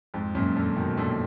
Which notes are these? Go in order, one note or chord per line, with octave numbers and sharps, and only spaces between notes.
F2 G#2
F#2 A#2
A#2 D3
B2 D#3
A#2 D3